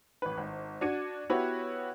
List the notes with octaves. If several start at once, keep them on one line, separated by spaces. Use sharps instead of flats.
A1 B4
G#1
D4 F#4 G#6 C#7 D#7
B3 E4 F#4 G4 B4 C#5